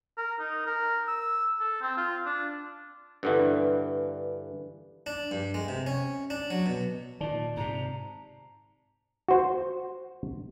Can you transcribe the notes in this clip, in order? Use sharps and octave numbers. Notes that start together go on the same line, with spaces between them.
A#4
D#4
A#4
E6
A4
C4
F4
D4
G2 D3 E3
D4
G2
G#3
C3
C#4
D4
F#3
B2
A#2 D#3 D5 A5
G#2 C3 A#5
F#4 C5